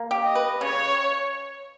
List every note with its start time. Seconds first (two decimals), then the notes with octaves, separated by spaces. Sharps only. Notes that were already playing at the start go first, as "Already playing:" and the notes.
Already playing: A#3
0.11 G4
0.23 D#5
0.35 B4
0.61 C#3 C#5